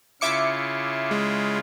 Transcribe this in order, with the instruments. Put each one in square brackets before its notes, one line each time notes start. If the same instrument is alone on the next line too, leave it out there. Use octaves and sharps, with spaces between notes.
[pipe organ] C#3 E4 F4 [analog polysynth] E5 D6 C#7
[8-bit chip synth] G#3